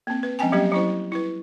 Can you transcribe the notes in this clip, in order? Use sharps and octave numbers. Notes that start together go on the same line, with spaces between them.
A#3 C4
B4
F3 G#3 C4 C#4 G5 G#5
F#3 G3 A#3 C#4 G4
F#3 C#4 E4 C5
E4 B4